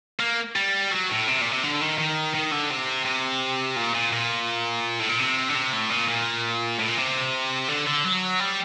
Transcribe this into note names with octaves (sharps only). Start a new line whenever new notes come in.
A#3
G3
F#3
A2
C3
A#2
C3
D3
D#3
D#3
D#3
D3
C3
C3
A#2
A#2
A#2
A2
A#2
C3
D3
C3
A2
A#2
A#2
A2
A#2
C3
D3
D3
F#3
G3